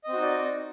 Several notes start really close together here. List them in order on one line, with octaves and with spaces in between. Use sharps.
D#5 C4 F#4 D#4 D5